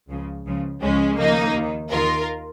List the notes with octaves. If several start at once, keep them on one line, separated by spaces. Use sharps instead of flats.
C#2 C#3 F3
C#2 C#3 F3
C#2 C#3 F3 G#3 C#4
D#2 C#3 F3 A#3 D#4
D#2 D#3
D#2 D#3 F4 A#4